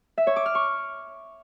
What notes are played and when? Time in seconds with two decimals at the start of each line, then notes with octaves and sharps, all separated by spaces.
0.18 E5
0.27 C#5
0.36 D6
0.46 F6
0.55 C#6